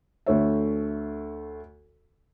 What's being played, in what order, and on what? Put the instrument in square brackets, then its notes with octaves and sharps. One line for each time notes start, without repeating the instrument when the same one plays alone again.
[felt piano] D2 A3 C#5 E5